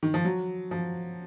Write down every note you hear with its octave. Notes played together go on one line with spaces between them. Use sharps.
D#3
F3
F#3
F3